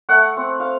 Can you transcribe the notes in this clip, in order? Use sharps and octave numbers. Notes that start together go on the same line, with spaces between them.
A3 F#5
C4
F5